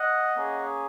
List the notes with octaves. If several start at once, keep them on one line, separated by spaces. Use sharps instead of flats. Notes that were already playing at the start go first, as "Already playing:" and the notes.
Already playing: D#5 F#5
A#3 C#4 G#4